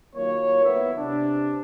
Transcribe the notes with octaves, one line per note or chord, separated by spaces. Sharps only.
D#3 F#3 A#3 F4 C#5
B3 E4
C3 D4